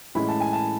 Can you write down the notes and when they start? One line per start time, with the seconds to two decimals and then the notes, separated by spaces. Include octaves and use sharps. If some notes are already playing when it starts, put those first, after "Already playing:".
0.15 A2 E3 G#3 C#4 B5
0.28 A5
0.40 G#5
0.53 A5